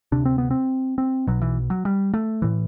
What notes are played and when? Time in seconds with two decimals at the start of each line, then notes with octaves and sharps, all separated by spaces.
0.12 D2 C3 D4
0.25 C4
0.38 B3
0.51 C4
0.98 C4
1.27 B1 B2 F#3
1.42 E3
1.70 F#3
1.85 G3
2.14 A3
2.42 A2 E3